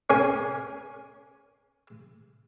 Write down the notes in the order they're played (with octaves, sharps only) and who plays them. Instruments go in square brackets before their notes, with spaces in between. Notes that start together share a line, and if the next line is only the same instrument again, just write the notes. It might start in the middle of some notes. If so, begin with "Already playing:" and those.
[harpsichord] C#4 A#4 G#5